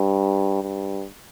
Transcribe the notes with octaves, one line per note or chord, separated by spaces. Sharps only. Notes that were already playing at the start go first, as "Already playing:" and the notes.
Already playing: G2
G2